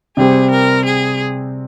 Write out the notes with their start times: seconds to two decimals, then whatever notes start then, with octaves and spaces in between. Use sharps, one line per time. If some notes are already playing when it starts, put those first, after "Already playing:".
0.17 C3 G3 C4 G4 G#4
0.51 A#4
0.85 G#4